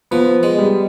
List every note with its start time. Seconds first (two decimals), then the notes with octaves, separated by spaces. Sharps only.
0.11 F3 B3
0.43 G#3
0.58 G3